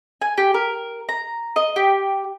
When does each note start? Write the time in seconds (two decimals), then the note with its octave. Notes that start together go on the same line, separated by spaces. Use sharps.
0.22 G#5
0.38 G4
0.54 A#4
1.09 A#5
1.56 D#5
1.76 G4